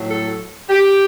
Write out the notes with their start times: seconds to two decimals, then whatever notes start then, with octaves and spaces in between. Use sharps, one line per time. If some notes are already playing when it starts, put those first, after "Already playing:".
Already playing: A2 F#3
0.09 A4
0.70 G4